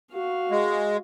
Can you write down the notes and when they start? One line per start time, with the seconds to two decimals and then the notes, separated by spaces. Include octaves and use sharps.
0.12 F#4 F5
0.51 G#3